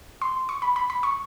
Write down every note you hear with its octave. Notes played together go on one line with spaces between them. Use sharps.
C6
C#6
B5
B5
B5
C#6